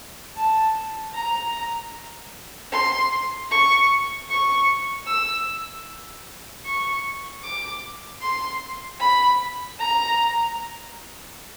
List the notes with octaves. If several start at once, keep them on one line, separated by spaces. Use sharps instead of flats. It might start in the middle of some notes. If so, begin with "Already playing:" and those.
A5
A#5
C6
C#6
C#6
E6
C#6
D6
C6
B5
A#5